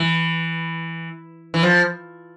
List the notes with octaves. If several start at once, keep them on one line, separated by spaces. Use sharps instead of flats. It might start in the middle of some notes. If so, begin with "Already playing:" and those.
Already playing: E3
E3
F3